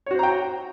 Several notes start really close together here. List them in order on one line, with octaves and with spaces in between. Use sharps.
C#5 F#4 C5 A#5 G5